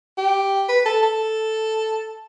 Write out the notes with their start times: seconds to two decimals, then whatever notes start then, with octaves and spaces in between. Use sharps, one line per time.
0.18 G4
0.69 B4
0.86 A4
1.03 A4